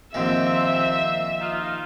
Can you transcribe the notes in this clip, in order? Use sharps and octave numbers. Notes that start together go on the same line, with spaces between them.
A#1 D#2 A#2 C4 E5
D#4 F4